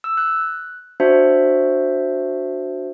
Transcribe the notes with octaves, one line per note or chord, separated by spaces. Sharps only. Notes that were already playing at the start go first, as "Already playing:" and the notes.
E6
F#6
D4 F#4 C5 E5